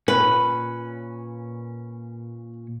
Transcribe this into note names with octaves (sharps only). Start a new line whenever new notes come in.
A#2 C#4 B4